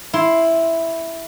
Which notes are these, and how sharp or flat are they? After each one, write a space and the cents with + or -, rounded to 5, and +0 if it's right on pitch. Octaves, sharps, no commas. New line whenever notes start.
E4 +0 C6 +0